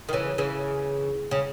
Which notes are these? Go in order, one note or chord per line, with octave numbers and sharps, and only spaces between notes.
D#3
C#3 E3
C#3 E3
C#3